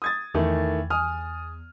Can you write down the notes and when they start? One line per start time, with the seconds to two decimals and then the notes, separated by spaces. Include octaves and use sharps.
0.02 D#6 G#6 A6
0.34 E2 D#3 E3 A3
0.90 G#5 D#6 F6